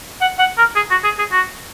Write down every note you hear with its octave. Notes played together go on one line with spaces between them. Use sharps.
F#5
F#5
A#4
G#4
F#4
G#4
G#4
F#4